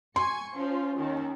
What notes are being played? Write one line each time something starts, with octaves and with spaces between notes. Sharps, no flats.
G#5 C6 C#6
F3 C#4 F4
D#2 D#3